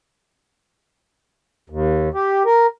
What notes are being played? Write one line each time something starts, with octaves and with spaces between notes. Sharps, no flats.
D#2
G4
A#4